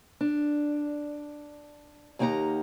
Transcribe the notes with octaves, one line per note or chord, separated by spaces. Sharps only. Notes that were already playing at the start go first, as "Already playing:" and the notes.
D4
D#2 A#3 D#4 G4 F#5 A#5